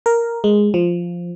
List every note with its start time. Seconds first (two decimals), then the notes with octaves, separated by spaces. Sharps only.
0.06 A#4
0.44 G#3
0.74 F3